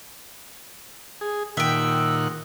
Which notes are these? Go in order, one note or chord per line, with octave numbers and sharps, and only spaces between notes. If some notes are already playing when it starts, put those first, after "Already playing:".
G#4
A#2 D#3 E5 F#5 G5